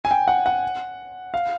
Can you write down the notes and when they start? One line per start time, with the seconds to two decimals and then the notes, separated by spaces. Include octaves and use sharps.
0.05 G#5
0.11 G5
0.28 F#5
0.46 F#5
1.34 F5